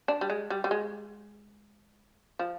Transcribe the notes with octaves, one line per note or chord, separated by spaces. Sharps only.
D4
G3
G#3
G3
G3
G#3
F3